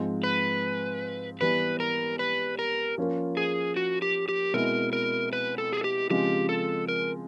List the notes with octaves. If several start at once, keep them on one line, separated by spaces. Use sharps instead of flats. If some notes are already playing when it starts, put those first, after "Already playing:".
Already playing: G#2 F3 G#3 C4
B4
E3 G3 B3 B4
A#4
B4
A#4
F3 A#3 C#4 F4 A#4
G#4
F#4
G4
G4
B2 G#3 C4 E4 A#4
A#4
B4
A4
G#4
G4
C#3 F3 G#3 C4 F4 G4
A4
A#4